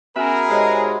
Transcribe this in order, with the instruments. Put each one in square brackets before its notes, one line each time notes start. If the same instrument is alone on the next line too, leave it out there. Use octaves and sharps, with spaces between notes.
[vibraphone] B3 C#4 G#5 [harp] F#4 E5 B5 [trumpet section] G#4 A#4
[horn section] G#2 G#3 [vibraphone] G4 C#5 D#5